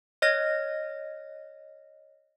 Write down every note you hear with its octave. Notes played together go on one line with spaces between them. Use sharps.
C#5 D#5 F6 A#6